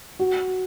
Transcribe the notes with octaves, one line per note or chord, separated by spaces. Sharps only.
F#4